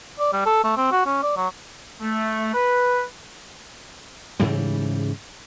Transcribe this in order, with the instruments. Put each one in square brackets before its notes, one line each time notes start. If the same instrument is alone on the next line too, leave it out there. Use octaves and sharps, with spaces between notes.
[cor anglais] D5
G3
A4
A3
C4
F#4
C#4
D5
F#3
[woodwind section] A3
B4
[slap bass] G#2 C#3 E3 G3